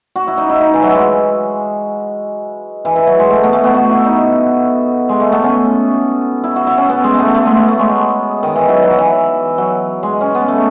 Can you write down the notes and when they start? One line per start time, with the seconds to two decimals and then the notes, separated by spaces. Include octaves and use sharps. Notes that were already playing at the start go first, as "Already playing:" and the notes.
0.16 F#4
0.27 E4
0.38 D#4
0.50 E4
0.61 D#4
0.74 E3
0.83 F#3
0.95 G#3
2.85 E3
2.96 E3
3.07 F#3
3.19 G#3
3.30 A3
3.44 B3
3.53 A3
3.64 B3
3.74 F#4
3.90 E4
4.05 D#4
5.09 G#3
5.20 A3
5.32 B3
5.44 C#4
6.44 E4
6.56 F#4
6.67 E4
6.78 C#4
6.90 B3
7.04 G#3
7.14 A3 B3
7.34 A3
7.46 G#3
7.56 A3
7.68 A3
7.79 G#3
8.43 D#3
8.56 E3
8.69 F#3
8.83 F#3
8.99 E3
9.58 F#3
10.03 G#3
10.21 C#4
10.35 B3
10.48 A3